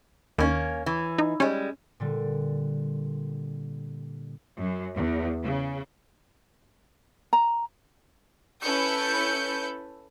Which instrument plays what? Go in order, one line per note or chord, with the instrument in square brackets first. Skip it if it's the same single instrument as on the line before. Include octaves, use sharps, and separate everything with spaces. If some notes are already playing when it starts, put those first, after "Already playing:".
[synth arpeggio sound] D#2 [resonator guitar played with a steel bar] A#3 C#4
[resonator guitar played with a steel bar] E3
[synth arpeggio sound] D#4
[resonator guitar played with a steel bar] G3 G#3 [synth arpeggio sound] C#4
[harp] A#2 D3 G3
[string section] F#2
E2
C#3
[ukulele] A#5
[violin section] C#4 E4 A4 B4 G6 C#7